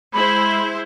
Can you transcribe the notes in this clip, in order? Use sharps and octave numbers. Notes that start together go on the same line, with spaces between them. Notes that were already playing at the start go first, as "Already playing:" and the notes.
G#3 E4 C5 B5